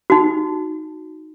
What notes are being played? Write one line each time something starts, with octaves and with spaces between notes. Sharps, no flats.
D#4 F#4